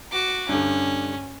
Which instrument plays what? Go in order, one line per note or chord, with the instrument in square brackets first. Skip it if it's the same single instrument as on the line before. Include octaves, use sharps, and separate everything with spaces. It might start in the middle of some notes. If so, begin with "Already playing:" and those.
[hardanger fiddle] F#4 D6
[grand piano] G2 D3 [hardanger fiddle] C#4